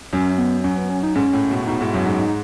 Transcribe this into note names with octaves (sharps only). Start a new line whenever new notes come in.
F#2 C#4
B3
F#2 C#4
B3
C#4
D#4
G#2 C#4
A2
B2
B2 D#4
G#2 E4
F#2 E4
G#2 D#4
D#4